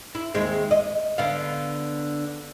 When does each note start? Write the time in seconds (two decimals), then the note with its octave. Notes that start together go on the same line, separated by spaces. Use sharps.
0.15 E4
0.35 D#2 G#3 C4
0.71 D#5
1.18 D3 B3 F5